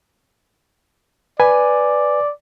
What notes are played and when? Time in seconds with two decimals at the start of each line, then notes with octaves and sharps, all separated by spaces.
1.40 B4 D5 G#5